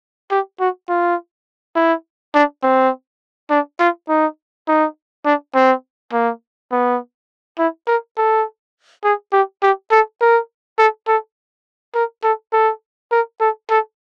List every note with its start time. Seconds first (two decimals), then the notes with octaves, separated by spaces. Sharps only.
0.31 G4
0.60 F#4
0.89 F4
1.76 E4
2.35 D4
2.63 C4
3.50 D4
3.80 F4
4.09 D#4
4.68 D#4
5.25 D4
5.55 C4
6.13 A#3
6.72 B3
7.59 E4
7.87 A#4
8.17 A4
9.04 G#4
9.33 G4
9.62 G4
9.91 A4
10.21 A#4
10.78 A4
11.08 A4
11.95 A#4
12.24 A4
12.53 A4
13.12 A#4
13.41 A4
13.70 A4